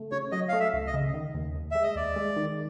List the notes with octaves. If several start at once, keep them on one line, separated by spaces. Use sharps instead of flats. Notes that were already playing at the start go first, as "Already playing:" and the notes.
Already playing: C#3 A3
C#3 C#5
F#3 D#5
A3 F5
E5
C#2
D#5
C#3
D#3
D#2
D#2
G#3 E5
D#5
D#2 D5
G#3
D#3